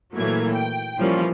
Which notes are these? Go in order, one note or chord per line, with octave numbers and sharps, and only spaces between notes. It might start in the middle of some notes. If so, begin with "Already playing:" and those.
A#2 E3 F#3 A3 A#3 G#6
G5
E3 F3 G3 A#3 C#4